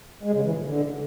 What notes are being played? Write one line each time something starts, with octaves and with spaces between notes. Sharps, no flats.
G#3
C#3
E3
A#2
D3